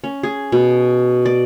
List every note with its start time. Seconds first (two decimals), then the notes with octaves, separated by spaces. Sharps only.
0.04 C#4
0.23 G#4
0.52 B2
1.25 D5